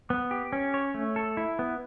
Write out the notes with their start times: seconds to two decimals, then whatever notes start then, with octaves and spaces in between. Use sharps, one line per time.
0.10 B3
0.31 G4
0.53 C#4
0.74 C#5
0.94 A3
1.16 A4
1.37 E4
1.59 B3